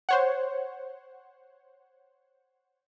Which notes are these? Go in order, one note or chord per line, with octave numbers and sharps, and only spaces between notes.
C5 C#5 F#5